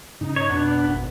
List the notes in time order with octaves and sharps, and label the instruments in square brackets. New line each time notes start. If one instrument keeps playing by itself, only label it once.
[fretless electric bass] G#2 C#3 C#4 [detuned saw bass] D#4
[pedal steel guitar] C#5
[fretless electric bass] F2 B2 [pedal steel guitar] B3 [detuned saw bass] D4
[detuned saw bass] G#1